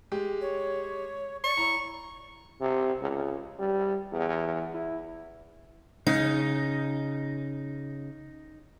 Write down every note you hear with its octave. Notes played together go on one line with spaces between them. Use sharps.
G#3 G4
C#5
D5 C#6
E4 A#5
C3
C#2
G3
E2
E4
C#3 D#4